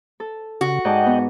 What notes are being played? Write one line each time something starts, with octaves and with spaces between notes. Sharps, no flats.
A4
C#3 F#4
G#2 D5 D#5 F#5 G5 A5
B3